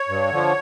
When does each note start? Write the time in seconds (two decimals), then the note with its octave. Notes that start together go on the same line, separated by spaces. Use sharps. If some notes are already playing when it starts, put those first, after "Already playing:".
Already playing: C#5
0.09 G2
0.31 D3 F3